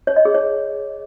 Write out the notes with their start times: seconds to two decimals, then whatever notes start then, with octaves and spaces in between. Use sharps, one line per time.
0.07 C#5
0.16 D#5
0.25 G#4
0.34 C#5